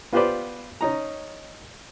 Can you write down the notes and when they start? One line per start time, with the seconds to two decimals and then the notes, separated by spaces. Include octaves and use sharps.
0.13 B3 F4 G4 B4 C5 D5
0.81 C#4 D#4 A#5